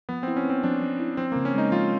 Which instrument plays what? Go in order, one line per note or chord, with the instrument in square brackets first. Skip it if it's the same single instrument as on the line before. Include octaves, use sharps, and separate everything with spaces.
[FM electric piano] F3 [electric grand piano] B3
[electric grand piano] C4
[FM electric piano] E4
[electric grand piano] C#4
[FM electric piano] B3 [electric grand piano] C4
[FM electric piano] F3 [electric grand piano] D4
[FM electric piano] F3
E4
[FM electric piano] F3 [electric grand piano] C4
[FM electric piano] C#3 [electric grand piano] A#3
[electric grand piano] C#4
[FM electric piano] G#3 [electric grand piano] D#4
[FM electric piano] F3 [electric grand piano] F4